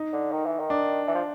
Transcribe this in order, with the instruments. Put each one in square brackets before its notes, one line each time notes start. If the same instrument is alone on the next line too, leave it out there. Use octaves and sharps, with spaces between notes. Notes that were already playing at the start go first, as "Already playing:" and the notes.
Already playing: [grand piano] D#4
[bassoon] D3
D#3
E3
D#3
[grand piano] D4
[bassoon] E3
F3